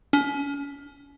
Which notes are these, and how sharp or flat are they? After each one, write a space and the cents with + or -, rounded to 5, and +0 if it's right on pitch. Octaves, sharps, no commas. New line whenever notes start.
C#4 +35